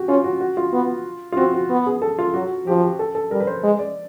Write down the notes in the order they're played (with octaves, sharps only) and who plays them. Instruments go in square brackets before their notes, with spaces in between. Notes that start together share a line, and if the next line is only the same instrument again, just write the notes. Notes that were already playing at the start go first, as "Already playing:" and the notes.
Already playing: [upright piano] F#4 G4
[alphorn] C#4 [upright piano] F4
[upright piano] F#4
F#4
F4
[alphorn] B3
[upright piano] F4
[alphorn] C4 [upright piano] F#4
[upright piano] F#4
[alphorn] B3
[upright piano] G#4
A4
F4
[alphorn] F#3 [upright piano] F#4
[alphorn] F3 [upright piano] G4
[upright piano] G4
A4
A4
[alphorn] G3 [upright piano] A#4
[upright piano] B4
C5
[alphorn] G#3
[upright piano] D5